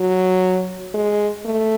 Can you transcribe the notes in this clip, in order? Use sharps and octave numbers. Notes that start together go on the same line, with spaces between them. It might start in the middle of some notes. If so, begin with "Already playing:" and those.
Already playing: F#3
G#3
A3